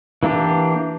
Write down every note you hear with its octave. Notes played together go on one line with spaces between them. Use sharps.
E3 A#3 D4 G4